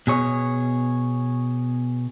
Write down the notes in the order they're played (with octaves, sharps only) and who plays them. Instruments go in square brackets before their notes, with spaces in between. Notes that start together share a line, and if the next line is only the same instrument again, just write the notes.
[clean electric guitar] B2 G#4 C#5